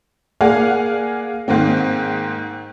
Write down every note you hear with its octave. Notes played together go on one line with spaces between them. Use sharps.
A#3 G#4 D5 F5 F#5 G#5
G#2 D#3 A#3 C4